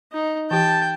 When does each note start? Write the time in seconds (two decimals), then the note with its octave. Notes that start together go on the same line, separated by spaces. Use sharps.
0.12 D#4
0.51 E3 G4 G5 A5